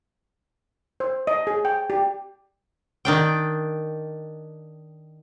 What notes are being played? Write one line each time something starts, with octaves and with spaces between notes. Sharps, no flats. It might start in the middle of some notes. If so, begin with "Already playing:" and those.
C5
D#5
G#4
G5
G4
D#3 D4 G5